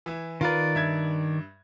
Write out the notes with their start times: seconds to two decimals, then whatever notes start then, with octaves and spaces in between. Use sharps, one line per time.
0.06 E3 E4
0.41 D#3 F4 A#4 B4 D5
0.75 G2 E5 G#6